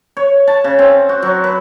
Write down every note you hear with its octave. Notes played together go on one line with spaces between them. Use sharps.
C#5
A5
C#3
C4
F#4
F#3
B4